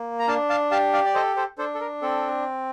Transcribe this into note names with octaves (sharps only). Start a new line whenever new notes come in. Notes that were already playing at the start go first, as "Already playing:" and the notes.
Already playing: A#3
A#5
D4 F5 A5
F5 A5
G4 F5 A5
D5 F5
D5
A4 C5 D#5
A4 C5
D4 A4 C5
A4
A#4
C4 A4